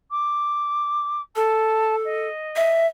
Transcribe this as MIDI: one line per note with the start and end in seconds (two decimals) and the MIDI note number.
0.11 1.22 86
1.36 2.28 69
1.36 1.96 81
2.05 2.81 75
2.56 2.87 76